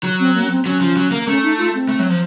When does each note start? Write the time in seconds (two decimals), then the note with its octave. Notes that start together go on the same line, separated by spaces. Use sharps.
0.04 F#3
0.19 C4
0.35 A#3
0.44 C#4
0.50 C4
0.66 F#3 C#4
0.81 F3
0.96 F#3
1.12 A#3
1.27 A3 C#4
1.43 D#4
1.58 F4
1.74 C4
1.89 A3
1.99 F#3
2.09 F3